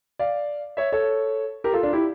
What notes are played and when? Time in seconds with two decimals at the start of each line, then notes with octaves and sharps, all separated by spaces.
0.19 D5 F5
0.77 C#5 E5
0.92 A4 C#5
1.64 G4 A#4
1.73 F4 A4
1.83 D4 F4
1.93 E4 G4